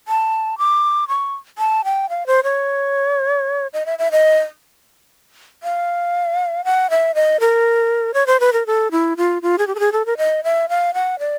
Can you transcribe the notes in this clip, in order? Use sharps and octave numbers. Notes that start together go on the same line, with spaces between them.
A5
D6
C#6
A5
G5
F5
C5
C#5
D#5
E5
E5
D#5
F5
F#5
E5
D#5
A#4
C#5
C5
B4
A#4
A4
E4
F4
F4
G#4
G4
A4
G#4
A4
A#4
D#5
E5
F5
F#5
D5